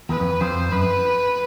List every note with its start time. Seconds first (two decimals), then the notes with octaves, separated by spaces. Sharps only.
0.09 E2 B4
0.20 F2
0.40 F2 C5
0.72 F#2 B4